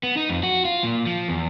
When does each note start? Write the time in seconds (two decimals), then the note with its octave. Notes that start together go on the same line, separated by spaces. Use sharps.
0.03 B3
0.17 D#4
0.29 F2
0.43 F#4
0.65 F4
0.84 A#2
1.06 F3
1.29 E2